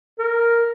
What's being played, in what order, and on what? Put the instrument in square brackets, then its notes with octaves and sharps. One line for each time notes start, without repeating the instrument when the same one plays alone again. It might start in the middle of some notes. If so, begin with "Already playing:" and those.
[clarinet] A#4